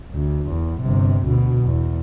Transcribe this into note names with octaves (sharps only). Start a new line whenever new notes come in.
D2
E2
G1 C3
D2 B2
E2